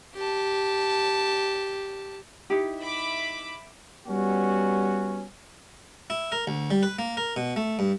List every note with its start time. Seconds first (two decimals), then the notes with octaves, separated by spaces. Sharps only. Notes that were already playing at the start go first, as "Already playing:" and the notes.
0.16 G4 A5
2.50 D#4 E4 G4
2.80 E5 B5 D6
4.07 G3 B3 C#4 F#4
6.10 E4
6.32 A#4
6.47 D2
6.70 G3
6.83 B4
6.99 A#3
7.17 A#4
7.36 B2
7.56 A3
7.79 G2